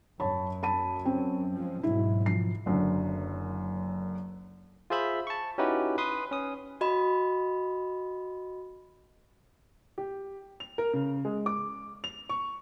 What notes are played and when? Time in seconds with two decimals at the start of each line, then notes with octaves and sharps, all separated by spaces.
0.20 F#2 C#5 A5 B5
0.63 A5 B5 D#7
1.05 C4 C#4
1.53 F3 G#3
1.83 G#2 B2 F#3 E4
2.26 F3 C7
2.66 F#1 F#2 D3
4.90 F4 G#4 C5 E5 B5
5.27 A5 C#6
5.58 C#4 D#4 E4 F#4 G4 B4
5.98 B4 C6 D#6
6.31 C#4 D#6
6.81 F#4 D#5 B5
9.98 G4
10.60 F7
10.78 A#4
10.93 C#3
11.25 G#3
11.46 D6
12.04 F7
12.29 C#6